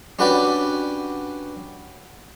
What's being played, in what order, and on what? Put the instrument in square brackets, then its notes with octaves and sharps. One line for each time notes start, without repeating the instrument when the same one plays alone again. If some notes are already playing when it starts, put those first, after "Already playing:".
[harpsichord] C#4 D4 F#4 G4 B4 D5